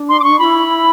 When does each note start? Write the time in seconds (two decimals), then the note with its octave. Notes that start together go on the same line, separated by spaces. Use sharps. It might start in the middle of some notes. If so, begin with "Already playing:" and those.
Already playing: D4
0.09 C6
0.20 D6
0.24 C#6
0.39 F4 B5
0.44 E4